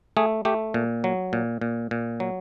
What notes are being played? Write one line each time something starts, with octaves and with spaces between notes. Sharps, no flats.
A3 G#4
A3 G4
A#2
F#3
A#2
A#2
A#2
F#3